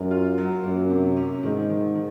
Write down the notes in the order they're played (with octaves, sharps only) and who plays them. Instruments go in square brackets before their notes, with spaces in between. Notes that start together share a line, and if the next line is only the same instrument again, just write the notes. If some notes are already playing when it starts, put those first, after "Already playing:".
Already playing: [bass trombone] F#2 [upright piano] A#4
[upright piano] F4
F#3
[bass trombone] F#2 [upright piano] A#3
[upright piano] C3
C#4
[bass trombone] G#2 [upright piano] D#3
[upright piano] D#3
D#3